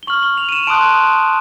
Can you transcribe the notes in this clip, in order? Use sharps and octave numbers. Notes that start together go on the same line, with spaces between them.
G7
C#6 F6 F#7
G7
F7
D#7
E7
A5 C6 D#6 F#6 D7